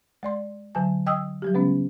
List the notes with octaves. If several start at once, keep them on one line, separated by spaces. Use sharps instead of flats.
G#3 D5 C6
D3 F#3 G#5 A5
D#5 G5 D#6 E6
F#3 G3 G4
C#3 G#3 B3 C#4